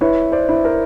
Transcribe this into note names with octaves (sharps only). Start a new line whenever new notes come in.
E4 B4 C#5
C5 D5
E4
A#4 C5